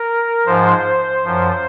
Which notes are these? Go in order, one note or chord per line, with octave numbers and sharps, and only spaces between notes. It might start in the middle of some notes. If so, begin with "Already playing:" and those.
Already playing: A#4
G#2 F3 C5
F#2 F3